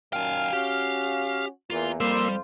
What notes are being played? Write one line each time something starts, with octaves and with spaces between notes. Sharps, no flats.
F#2 A#2 D#3 F5 G5 G#5
C#4 F#4 G4
E2 A#3 F4
F2 G3 A#3 F4 C5 C6 E6